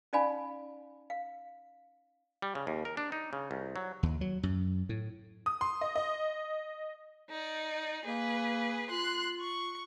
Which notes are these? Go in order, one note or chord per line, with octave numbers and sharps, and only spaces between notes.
C#4 D#4 D5 F5 G#5 B5
F5
G3
C#3
D#2
A#4
D4
D#4
C#3
C2
F#3
D#2
F#3
F#2
A2
D#6
C6
D#5
D#5
D#4 D5
A#3 G#4 B4
F4 C6 F#6
C#6